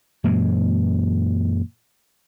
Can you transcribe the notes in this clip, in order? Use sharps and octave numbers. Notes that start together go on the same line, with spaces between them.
F#2 A#2 E3 G#3